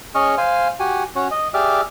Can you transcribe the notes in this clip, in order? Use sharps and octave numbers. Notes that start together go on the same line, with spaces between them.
C#4 G#4 D#5 C#6 F6
C5 F5 G#5
F#4 G4 G#5
C#4 F#4 C#5
D#5
G4 G#4 D5 E5 D6 F6